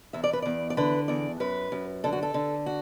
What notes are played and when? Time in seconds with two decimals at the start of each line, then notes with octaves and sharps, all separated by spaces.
0.13 E2 E5
0.24 D5
0.33 B4
0.42 E2 D5
0.70 D5
0.77 D3 B4
1.08 E2 D5
1.40 F#2 B4
1.72 F#2
2.04 D3 A4
2.13 F#4
2.23 A4
2.34 D3
2.66 F#4